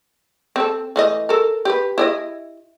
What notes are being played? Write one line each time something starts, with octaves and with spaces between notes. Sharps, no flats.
C4 A4
E3 A3 D#5
A4 A#4
G4 B4
E4 D5 D#5